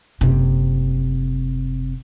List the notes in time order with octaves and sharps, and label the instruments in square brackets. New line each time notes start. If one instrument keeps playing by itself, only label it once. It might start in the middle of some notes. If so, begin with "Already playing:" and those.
[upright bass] F#1 C3